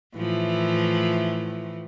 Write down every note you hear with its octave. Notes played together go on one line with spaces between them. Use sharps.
A2 E3 F3